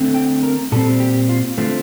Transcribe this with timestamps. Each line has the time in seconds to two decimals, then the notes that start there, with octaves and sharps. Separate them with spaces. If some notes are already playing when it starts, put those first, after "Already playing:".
Already playing: D3 A3 C4
0.15 G5
0.43 A#4
0.72 A#2 G3 C4 A4
1.00 G4
1.29 F4
1.57 D3 A3 C4 F4